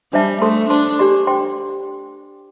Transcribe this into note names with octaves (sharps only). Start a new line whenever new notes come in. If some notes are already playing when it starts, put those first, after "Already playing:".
G3 D4 C5 E5 A5
A3 A4 C5 A5 C6
D4 C5 A5 C6
D4 G4 D5 C6
C5 G5 C6